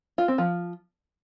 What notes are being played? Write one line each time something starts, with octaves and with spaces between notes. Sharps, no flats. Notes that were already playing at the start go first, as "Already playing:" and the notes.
F4
C4
F3